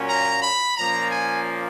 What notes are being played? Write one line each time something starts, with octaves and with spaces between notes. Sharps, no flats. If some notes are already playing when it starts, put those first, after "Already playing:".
Already playing: A#2 F#3 A#3 C#4
A#5
B5
A#2 F3 A#3 C#4 A#5
G#5